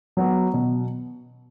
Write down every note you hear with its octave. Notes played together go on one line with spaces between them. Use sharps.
F#3 B3
B2